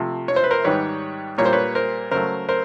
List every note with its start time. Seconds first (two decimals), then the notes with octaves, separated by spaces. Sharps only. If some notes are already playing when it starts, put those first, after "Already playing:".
Already playing: C3 F3 A3
0.28 C#5
0.36 C5
0.44 B4
0.51 A#4 C5
0.64 G#2 D#3 G3 B4 C#5
1.38 A#2 G3 A#3 C#5
1.46 C5
1.53 B4 C#5
1.75 A#4 C5
2.11 C#3 F#3 A3 A#4 C5
2.49 A#4 C5